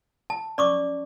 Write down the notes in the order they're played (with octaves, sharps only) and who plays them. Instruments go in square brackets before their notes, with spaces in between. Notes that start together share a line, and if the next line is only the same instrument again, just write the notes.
[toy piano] A5
[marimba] C#4 [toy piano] D5 C#6 D6